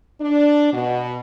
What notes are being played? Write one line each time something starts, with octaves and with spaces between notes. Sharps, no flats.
D4
B2